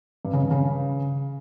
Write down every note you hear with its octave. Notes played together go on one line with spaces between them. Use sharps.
G2
C#3
G2
C#3